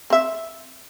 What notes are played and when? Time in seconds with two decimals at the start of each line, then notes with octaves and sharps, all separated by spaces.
0.10 C4 E5